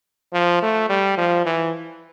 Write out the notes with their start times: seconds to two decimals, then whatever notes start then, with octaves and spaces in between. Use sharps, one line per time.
0.33 F3
0.62 A3
0.89 G3
1.18 F3
1.46 E3